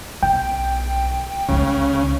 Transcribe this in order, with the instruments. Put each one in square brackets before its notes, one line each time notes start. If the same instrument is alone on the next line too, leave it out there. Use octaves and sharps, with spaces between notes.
[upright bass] B1 [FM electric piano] G5
[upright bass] C#2 D#4 [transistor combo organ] C#3